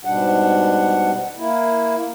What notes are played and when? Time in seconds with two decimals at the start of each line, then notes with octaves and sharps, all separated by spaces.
0.05 G#2 B2 G3 D4 F#5
1.37 A#3 E4